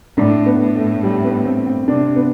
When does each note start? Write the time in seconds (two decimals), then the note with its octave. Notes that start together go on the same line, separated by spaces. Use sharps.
0.17 A2 D4
0.46 B3
0.59 A2
0.75 A3
1.03 G3
1.24 B3
1.45 C4
1.67 C4
1.88 C3 D4
2.16 B3